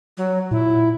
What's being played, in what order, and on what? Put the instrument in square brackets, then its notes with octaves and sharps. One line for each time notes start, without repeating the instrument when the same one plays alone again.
[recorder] F#3
[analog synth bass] A#2 [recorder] E4